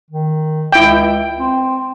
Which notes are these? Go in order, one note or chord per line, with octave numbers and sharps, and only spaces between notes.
D#3
C#2 E4 G5
C4